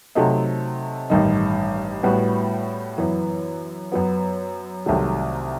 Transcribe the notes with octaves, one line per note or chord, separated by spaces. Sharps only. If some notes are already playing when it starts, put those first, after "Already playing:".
C3 F#3 A3 C4 D#4
A1 G2 D#3 G3 D#4
A2 G3 B3 F#4
F#2 E3 B3
F#2 F#3 B3
C2 C3 D#3 F#3 A3